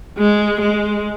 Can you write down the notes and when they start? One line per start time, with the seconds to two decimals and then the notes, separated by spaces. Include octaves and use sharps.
0.18 G#3
0.61 G#3